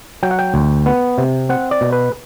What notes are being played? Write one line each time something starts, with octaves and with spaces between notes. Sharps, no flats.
F#3 G5
F#5
G5
D2
B3
C3
C4 F#5
D5
B2
B4